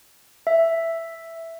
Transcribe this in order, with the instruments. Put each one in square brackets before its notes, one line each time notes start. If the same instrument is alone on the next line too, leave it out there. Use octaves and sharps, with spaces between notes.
[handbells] E5